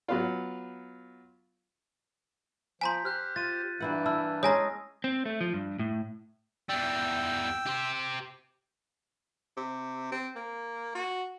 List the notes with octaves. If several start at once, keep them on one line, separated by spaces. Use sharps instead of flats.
F#3 B3 F4
F3 G#5 A#5 C6 G6 B6
G4 C5 F6 F#6
F4 A6 D#7
G2 E3 A#3 E4 F#5
E4 A5 E6 F6
G#3 C#4 C#5 G#5 A#5 D#6 A#6
C4
A3
F3
G2
A2
E2 G3 G5 E6
G4 C5
C3
C4
A#3
F#4